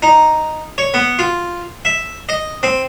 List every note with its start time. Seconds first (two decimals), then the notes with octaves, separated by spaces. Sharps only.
0.02 D#4
0.78 C#5
0.94 B3
1.19 F4
1.85 E5
2.29 D#5
2.63 C4